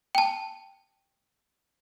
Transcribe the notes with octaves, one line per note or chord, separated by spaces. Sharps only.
G5 A5